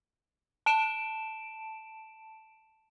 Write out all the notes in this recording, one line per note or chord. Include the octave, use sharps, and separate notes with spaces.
A5 D7 E7